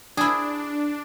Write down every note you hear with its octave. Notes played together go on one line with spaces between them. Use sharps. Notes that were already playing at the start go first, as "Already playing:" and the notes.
D4 E4 G#4